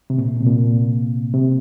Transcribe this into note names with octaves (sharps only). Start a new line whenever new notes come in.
C3
A#2
C3
A#2
C3